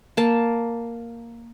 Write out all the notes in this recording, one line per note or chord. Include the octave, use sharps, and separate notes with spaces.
A#3 A5